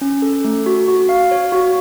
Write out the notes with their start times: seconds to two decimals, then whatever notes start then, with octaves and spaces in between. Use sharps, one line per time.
0.01 C#4
0.22 A4
0.45 A3
0.66 F#4
0.88 F#4
1.09 F5
1.31 C#5
1.52 F#4